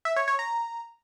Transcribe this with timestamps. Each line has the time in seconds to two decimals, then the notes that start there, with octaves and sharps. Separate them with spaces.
0.05 E5
0.16 C#5
0.28 C#5
0.39 A#5